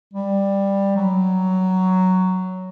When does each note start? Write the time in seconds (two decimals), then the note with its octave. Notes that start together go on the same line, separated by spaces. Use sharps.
0.14 G3
0.96 F#3